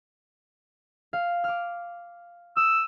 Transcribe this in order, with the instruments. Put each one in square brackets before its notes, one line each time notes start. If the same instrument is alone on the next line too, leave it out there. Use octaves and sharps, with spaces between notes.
[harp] F5
D6 F6
[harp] D#6 [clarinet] E6